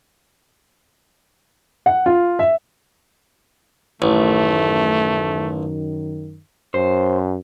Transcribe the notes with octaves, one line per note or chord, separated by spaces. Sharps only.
F#5
F4
E5
A1 F#2 D#3 A3
F#2 C5